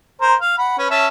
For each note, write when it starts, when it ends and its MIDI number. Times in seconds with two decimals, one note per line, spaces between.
0.21 0.35 70
0.21 0.35 72
0.40 0.56 77
0.58 0.74 78
0.58 0.74 83
0.78 0.87 61
0.78 0.87 71
0.90 1.08 61
0.90 1.08 76
0.90 1.08 81